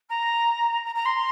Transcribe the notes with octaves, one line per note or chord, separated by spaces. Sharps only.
A#5
A#5
A#5
C6